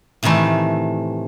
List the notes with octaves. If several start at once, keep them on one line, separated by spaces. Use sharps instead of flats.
A2 C3 D#3 E3 A3